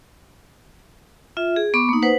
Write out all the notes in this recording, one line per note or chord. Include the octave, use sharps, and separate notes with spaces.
F4 E5
G#4
B3 B5 C#6 D6
A#3 D#4
B4 C5 F#5